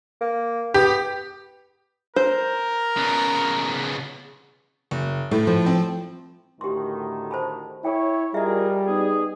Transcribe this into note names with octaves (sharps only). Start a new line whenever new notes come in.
A#3
B3 G4
A#4 C5
C#3 B3
F#1
A2 A3
F3
C4
D2 A2 D#3 G4 C6
C5 A5 B5
E4 A4 C#5 G5
G3 F4 G#4 A#4 D#5 E5
B3 D#4 G#4